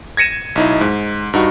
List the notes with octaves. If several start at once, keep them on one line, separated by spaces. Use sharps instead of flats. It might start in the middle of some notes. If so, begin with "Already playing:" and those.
G#6 A#6 C#7 D#7 E7
B1 D#4 E4
G#2
G2 D#4 F#4